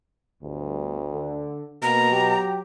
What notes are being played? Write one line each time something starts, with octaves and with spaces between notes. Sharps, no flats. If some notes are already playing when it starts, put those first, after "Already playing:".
G1 D2
D3
B2 A#3 A#5
F#3 G4